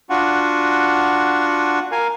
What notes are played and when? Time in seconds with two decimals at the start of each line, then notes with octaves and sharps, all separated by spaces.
0.10 D4 F4 F#4 F#5
1.92 A#4 F5 G#5